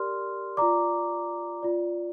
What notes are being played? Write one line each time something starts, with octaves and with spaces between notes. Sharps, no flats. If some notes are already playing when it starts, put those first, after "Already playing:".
Already playing: G4 A#4 D5 C6 F6
F4 D5 A#5 D6
F4 D5